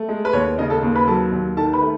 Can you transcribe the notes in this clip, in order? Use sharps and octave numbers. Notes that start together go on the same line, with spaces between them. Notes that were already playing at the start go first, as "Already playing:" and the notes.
Already playing: A3
G#3
B4
D#2 C#5
C#3 D#4 D#5
A4 A5
D#2
B4 B5
F#3 A4 A5
D#2
D#3 A4 A5
B4 B5
A3